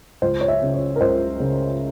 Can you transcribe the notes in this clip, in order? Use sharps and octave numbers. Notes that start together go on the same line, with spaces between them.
C#2 C5
C#5
E5
C#3
C#5
A#4
C#2 C5
C#3